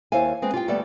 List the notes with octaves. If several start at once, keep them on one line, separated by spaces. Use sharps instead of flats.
D#2 E4 C5 C#5 F5 G#5
G#3 C4 B4
F4 G4 G5
D2 G3 A3 B3 D5